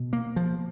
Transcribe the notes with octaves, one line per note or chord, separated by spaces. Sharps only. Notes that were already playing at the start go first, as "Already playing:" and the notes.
Already playing: B2
A#3
F3